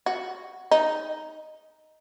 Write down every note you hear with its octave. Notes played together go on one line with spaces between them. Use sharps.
F#4
D#4